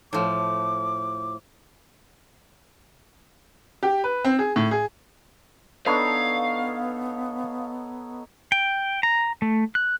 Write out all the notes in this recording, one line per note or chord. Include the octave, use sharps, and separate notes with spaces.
A2 F3 D6
G4
B4
C4
G#4
A2
G#4
B3 D4 D#4 A4 B4 C#5 F5
G5
A#5
A3
F#6